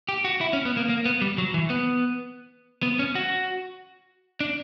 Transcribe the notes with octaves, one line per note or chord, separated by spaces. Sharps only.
G4
F#4
E4
C#4
B3
A#3
A#3
B3
G3
F#3
E3
B3
B3
C#4
F#4
D4